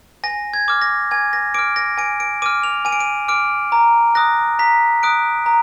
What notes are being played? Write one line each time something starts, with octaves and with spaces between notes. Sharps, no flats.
G#5 A#6
G#6
D6 F6
A#6
G#5 G#6
A#6
D6 F6 D7
A#6
G#5 D7
D7
D6 F6 D#7
F7
G#5 D#7
D7
D#7
D6 F6 D7
A#5
D#6 F#6 A#6
A#5 B6
D#6 F#6 D7
A#5